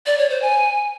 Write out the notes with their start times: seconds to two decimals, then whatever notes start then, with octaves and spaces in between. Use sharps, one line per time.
0.06 D5
0.18 C#5
0.30 C5
0.42 G#5